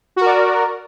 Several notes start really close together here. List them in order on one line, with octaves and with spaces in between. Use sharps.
F#4 A#4 D5